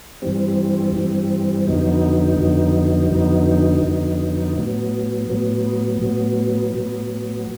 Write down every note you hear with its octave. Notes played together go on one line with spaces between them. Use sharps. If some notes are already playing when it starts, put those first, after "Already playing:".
G2 E3 G3 C4
G2 E3 G3 C4
F2 D3 F#3 B3 D#4
F2 D3 F#3 B3 D#4
F2 D3 F#3 B3 D#4
F2 D3 F#3 B3 D#4
A2 F#3 B3
A2 F#3 B3
A2 F#3 B3
A2 F#3 B3